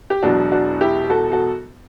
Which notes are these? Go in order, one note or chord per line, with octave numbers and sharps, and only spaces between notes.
G4
E1 E2 B2 F#3 D4 F#4
D4 F#4
E4 G4
F#4 A4
F#4 A4